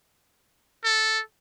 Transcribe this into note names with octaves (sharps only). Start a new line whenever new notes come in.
A4